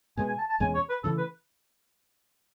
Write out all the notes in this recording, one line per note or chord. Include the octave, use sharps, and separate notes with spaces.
B2 G#3 B3 G#5
G#5
A5
A5
E2 B2 G#3 C#4 G#5
C#5
B4
C#3 E3 A3 A4
B4